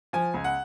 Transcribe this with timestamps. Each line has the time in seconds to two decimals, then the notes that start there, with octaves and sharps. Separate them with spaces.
0.13 F3 G#5
0.34 C#2
0.44 F#5